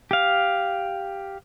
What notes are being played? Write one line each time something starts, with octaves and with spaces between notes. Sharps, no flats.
G4 F5